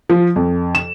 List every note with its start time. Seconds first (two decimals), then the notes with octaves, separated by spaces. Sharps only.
0.09 F3
0.36 F2
0.75 E7